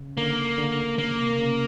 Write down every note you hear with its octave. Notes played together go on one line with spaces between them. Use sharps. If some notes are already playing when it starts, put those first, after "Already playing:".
Already playing: C#3
D3 A#3
D3
C#3 A#3
C3
C#3